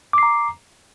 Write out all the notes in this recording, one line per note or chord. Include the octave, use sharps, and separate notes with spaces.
A#5 D6 C7